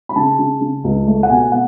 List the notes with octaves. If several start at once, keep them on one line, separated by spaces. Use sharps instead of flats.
B5
C#3 A5
C#3
C#3
C#2
A3
F#5
B2 G#5
B2 F#5